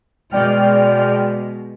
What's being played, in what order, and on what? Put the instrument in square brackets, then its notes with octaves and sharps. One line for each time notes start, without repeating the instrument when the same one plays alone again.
[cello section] B2 G#3 [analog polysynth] D5 G5 F6